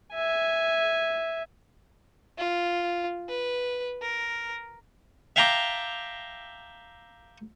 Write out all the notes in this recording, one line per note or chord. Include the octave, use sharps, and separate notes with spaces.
E5 G#5
F4
B4
A#4
E5 F5 G5 A5 A#5 D6